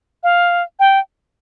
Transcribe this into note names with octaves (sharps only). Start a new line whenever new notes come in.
F5
G5